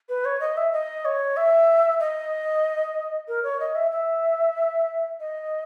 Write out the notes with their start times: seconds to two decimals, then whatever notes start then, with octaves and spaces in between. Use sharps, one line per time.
0.09 B4
0.25 C#5
0.40 D#5
0.57 E5
0.73 D#5
1.05 C#5
1.37 E5
2.00 D#5
3.28 A#4
3.43 C#5
3.60 D#5
3.75 E5
3.91 E5
5.20 D#5